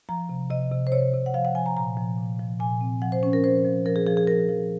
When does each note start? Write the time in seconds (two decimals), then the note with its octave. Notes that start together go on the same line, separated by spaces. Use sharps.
0.09 F3 A#5
0.29 C3
0.50 C3 D#5
0.72 C3
0.87 C5
0.92 C3 C#5
1.13 C3
1.26 F#5
1.34 F3 F5
1.45 F#5
1.55 F3 G#5
1.66 A#5
1.76 A#2 A#5
1.97 F3
2.18 A#2
2.39 F3
2.60 A#2 G#5
2.81 C4
3.02 F3 F#5
3.12 C5
3.23 F3 C#4
3.33 A#4
3.44 F3 C5
3.65 F3
3.86 F3 A#4
3.96 G#4
4.06 F3 G#4
4.17 G#4
4.27 F3 A#4
4.49 F3